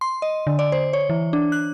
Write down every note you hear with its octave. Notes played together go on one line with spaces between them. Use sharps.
C6
D#5
D3
D5
C5
C#5
E3
D4
F#6